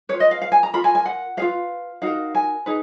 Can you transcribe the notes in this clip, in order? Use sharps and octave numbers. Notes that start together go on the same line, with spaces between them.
F4 B4 C#5
D#5
F5
F5
G#5
A#5
F4 A#4 B5
G#5
G#5
F#5
F4 G#4 B4 F5
D#4 F#4 A#4 F5
G#5
D#4 G#4 B4